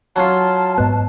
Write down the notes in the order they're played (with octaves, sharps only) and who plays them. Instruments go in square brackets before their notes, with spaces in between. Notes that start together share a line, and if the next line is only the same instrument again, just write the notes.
[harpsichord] F#3 C#4 F4 [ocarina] A5
[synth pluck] G#2 B3